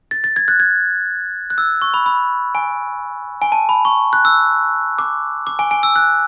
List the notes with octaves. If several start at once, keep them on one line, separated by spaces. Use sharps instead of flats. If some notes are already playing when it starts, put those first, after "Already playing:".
A6
A6
G#6
F#6
G#6
F#6
E6
C#6
B5
B5
G#5
G#5
A5
B5
C#6
F#6
E6
D6
D6
G#5
G#5
E6
F#6